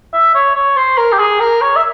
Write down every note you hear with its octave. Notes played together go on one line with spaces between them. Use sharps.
E5
C#5
C#5
C5
A#4
G4
G#4
A#4
C#5
E5